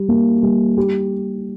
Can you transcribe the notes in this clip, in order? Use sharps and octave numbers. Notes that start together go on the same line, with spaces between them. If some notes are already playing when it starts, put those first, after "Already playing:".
Already playing: G3
A#3
G3
G4